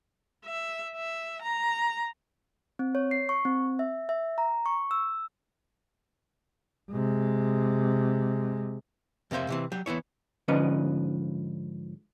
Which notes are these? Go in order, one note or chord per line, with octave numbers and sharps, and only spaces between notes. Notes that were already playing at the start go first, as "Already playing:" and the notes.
E5
E5
A#5
C4
C#5
C7
C#6
C4
E5
E5
A#5
C#6
E6
C3 G#3
F2 C3 A#3 C5 E5
C3 E3 C4
F#3 G4
E3 B3 E4 C#5
G#2 D3 F3 C#4 B4 D#5